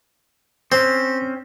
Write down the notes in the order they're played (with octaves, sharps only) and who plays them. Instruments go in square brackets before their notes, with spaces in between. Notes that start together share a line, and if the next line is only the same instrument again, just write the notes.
[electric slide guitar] C4 C#4 [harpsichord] C5